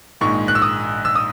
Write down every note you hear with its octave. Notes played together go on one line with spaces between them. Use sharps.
A#1 G#2 D#3 G#3 C#6
F#6
E6
D#6
E6
D#6